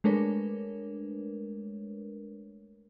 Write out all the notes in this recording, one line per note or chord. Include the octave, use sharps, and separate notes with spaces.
G#3 A3 D4 A#4 B4 C#5